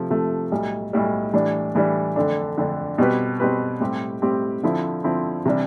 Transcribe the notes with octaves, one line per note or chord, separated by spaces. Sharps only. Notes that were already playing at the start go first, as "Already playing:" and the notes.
Already playing: C3 F3 A3
C3 F3 A3
B1 A2 G3
B1 A2 G3
A2 E3 G3 D4
A2 E3 G3 D4
F2 D3 A3 D4
F2 D3 A3 D4
B2 G3 C4 G4 B4
B2 G3 C4 G4 B4
A2 G3 C4 G4
A2 G3 C4 G4
D3 F3 C4 E4
D3 F3 C4 E4
C3 E3 G3 D4